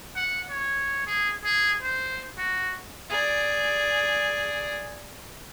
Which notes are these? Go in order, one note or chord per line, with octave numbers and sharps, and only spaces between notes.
F#5
C#5
G#4
G#4
C5
F#4
G#4 D5